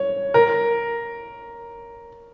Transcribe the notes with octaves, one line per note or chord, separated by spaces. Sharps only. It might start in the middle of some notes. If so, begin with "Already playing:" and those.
Already playing: C#5
A#4